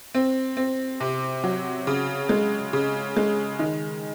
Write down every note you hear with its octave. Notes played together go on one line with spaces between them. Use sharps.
C4
C4
C3
F#3
C#3
G#3
C#3
G#3
D#3